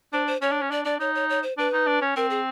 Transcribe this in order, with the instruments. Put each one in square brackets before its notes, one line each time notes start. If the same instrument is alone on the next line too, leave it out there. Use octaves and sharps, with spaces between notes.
[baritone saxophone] D4 [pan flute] C5
[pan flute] C5
[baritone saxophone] C#4 [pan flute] C#5
[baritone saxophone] D4
C#4
[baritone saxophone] D4 [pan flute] D5
[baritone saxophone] D4 [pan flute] D5
[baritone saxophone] D#4 [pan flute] C#5
[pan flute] C#5
C#5
C5
[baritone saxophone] D4 [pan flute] B4
[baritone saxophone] D#4
D4
C#4
[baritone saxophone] C4 [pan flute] A#4
[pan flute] G#4